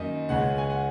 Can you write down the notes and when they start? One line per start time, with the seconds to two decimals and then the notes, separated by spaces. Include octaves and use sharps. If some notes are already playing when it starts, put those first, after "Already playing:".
Already playing: F#2 D#3 A#3 D#5
0.29 C#2 C#3 G#3 C#4 F#5
0.58 G#5
0.70 F#5